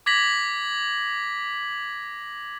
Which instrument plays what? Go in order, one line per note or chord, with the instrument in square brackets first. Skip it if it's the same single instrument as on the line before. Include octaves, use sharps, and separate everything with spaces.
[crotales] D6 G#6 A#6 B6 F#7